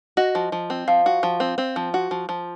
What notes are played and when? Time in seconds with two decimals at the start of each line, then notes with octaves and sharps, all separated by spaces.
0.17 F#4 D#5
0.35 F3
0.52 F3
0.70 C4
0.88 F3 F5
1.06 F#4
1.23 F3
1.40 C4
1.58 C4
1.76 F3
1.94 F#4
2.11 F3
2.29 F3